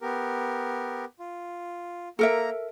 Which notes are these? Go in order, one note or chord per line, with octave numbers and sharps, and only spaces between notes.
B3 G4 A#4
F4
A#3 A4 A#4 E5 A#5